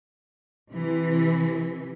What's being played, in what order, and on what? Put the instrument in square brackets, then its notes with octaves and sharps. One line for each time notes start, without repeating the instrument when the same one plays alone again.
[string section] C3 E3